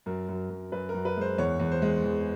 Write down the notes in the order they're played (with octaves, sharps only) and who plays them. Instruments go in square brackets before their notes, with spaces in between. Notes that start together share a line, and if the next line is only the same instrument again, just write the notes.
[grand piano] F#2 A#4
F#2
F#2
F#2 B4
A#4
F#2
B4
G#3 C5
E2 C#5
E2
C5
G#3
E2